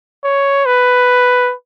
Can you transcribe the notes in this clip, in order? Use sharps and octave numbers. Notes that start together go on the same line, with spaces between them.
C#5
B4